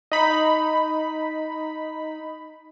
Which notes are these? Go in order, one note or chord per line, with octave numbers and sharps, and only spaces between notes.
D#4 B5